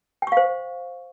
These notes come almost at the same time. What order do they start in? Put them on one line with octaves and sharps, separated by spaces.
G5 C#6 F5 C5